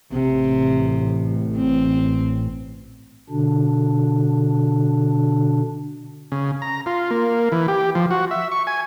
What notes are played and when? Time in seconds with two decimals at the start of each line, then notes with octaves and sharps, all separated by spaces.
0.12 A1 C3
1.57 C4
3.30 B2 D3 D4
6.32 C#3
6.62 A#5
6.86 F4
7.10 A#3
7.52 E3
7.68 G4
7.95 F3
8.11 F#4
8.31 E5
8.52 C#6
8.67 G#5